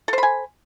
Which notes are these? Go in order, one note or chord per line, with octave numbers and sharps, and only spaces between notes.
A4 C5 G#5 B5